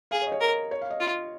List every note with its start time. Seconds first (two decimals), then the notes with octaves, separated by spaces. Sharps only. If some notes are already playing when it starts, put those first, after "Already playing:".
0.11 G#4 F5
0.22 C#5
0.27 D#5
0.32 C#5
0.41 A#4
0.71 C#5
0.81 F5
0.90 D#5
1.00 F4